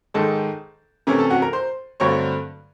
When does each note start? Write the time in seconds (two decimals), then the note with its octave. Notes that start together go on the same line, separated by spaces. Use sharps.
0.14 G#2 D#3 G#3 A4 A5
1.07 C3 E3 A3 C#4 A#4 A#5
1.19 A4 A5
1.30 F#4 F#5
1.42 A#4 A#5
1.53 C5 C6
2.00 G2 D3 F#3 A3 C4 C#5 C#6